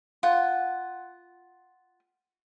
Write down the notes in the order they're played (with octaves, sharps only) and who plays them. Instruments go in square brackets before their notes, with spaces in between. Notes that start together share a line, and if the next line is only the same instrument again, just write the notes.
[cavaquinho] F4 F#5